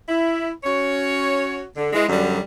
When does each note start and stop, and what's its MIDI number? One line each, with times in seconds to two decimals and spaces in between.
0.08 0.50 64
0.64 1.61 61
0.64 1.61 66
0.64 1.61 73
1.76 1.89 50
1.93 2.04 52
1.93 2.04 56
2.08 2.40 42
2.08 2.40 50
2.08 2.40 54
2.08 2.40 55